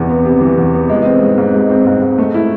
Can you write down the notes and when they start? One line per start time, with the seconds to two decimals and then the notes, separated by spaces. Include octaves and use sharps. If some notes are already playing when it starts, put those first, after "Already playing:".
Already playing: E2 C3 E3
0.09 B3
0.25 C3
0.41 E3
0.58 E2
0.74 B3
0.90 G#3
1.05 C4
1.22 G#2
1.38 G#2
1.54 G#3
1.70 C4
1.86 G#2
2.02 G#2
2.18 A3
2.34 E4